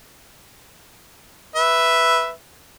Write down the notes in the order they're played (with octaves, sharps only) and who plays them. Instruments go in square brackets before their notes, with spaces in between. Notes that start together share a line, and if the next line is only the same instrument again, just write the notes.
[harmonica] B4 E5